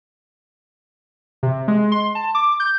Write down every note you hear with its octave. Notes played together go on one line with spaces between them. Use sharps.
C3
G#3
C6
A5
D6
G6